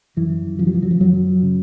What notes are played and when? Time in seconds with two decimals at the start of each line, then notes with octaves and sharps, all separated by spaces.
0.17 F#2 E3
0.58 C#3 F3
0.67 F#3
0.74 F3
0.83 F#3
0.91 F3
1.01 F#2 F#3
1.42 C#3